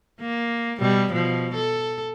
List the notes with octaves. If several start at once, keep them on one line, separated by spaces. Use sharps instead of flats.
A#3
B2 G3
B2 F3
A4